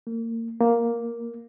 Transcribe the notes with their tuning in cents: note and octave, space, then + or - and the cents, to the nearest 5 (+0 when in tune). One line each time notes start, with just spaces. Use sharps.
A#3 -30
A#3 +5